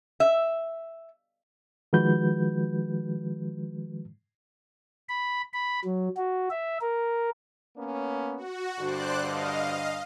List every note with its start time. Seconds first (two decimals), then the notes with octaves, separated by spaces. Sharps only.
0.20 E5
1.93 D#3 F3 G#3 F#4 B4 G6
5.09 B5
5.53 B5
5.85 F#3
6.17 F#4
6.50 E5
6.81 A#4
7.77 A#3 B3 C#4
8.37 F#4
8.80 G2 D3 C5 D5 F#6
9.22 D#5 F5